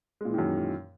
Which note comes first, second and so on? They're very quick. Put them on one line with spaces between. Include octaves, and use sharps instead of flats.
G#3 A#2 E3 D#3 F#2